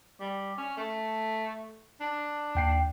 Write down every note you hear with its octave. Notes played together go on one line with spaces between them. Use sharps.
G3
C#4
A3
D4
D#2 G5 C7